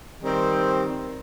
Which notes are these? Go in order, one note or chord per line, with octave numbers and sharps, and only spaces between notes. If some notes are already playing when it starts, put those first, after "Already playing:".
D#3 G3 C4